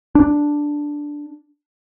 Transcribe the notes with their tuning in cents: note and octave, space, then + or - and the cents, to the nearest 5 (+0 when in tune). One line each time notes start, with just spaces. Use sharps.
D4 +0